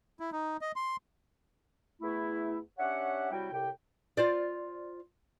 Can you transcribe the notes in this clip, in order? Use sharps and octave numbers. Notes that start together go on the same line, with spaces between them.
E4
D#4
D#5
C6
E2 A3 E4
C#4 D4 G4 C#5 E5 F#5
C3 F#3 G3 E4 F#4 G5
C2 A2 C3 G4 G5
F4 C5 D5